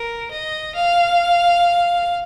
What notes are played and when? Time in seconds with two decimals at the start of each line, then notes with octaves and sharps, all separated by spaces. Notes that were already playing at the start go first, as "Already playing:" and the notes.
Already playing: A#4
0.31 D#5
0.75 F5